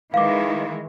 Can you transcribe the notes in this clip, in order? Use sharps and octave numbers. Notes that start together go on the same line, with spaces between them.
D#3 E3 G#3 F5 D6